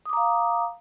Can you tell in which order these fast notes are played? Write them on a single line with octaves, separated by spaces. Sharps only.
D#6 D6 A#5 F5